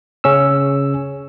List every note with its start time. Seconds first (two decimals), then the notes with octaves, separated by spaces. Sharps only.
0.24 C#3 C#4 E6